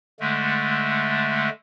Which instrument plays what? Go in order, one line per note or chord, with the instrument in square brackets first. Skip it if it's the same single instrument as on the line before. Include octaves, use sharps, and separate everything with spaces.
[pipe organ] D3 G#3 A3